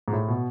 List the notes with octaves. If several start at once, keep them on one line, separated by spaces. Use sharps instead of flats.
G#2
A2
B2